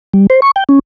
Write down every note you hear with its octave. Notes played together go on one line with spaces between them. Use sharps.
G3
C5
C#6
G5
C#4